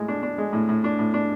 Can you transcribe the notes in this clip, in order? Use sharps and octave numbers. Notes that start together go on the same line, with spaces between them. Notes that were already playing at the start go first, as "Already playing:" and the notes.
Already playing: A2 G#3
D4
D4
G#3
A2
A2
D4
A2
D4